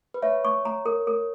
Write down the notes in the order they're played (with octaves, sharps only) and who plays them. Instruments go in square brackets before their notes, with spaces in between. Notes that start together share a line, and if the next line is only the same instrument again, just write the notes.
[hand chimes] B4
[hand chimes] C#5 [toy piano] E5
[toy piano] C#6
A#5
A#4
A#4